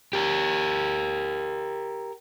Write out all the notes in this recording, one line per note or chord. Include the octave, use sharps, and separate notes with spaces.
G4 A#4